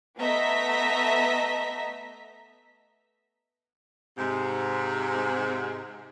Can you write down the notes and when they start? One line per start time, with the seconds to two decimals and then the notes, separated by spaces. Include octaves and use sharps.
0.20 A3 B3 D#5 E5 A#5 B6
4.16 G#2 C3